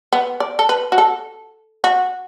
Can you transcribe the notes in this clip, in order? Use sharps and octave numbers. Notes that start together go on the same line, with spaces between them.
B3
D5
A4
B4
F#4
A4
F#4